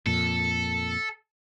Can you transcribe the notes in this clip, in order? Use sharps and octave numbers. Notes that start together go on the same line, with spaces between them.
F2 A#2 A4